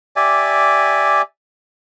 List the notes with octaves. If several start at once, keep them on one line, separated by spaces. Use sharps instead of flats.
G4 D5 E5 G#5